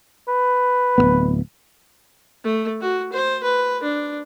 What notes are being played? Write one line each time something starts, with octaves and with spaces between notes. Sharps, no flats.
B4
D1 F#2 B3
A3
F#4
C5
B4
D4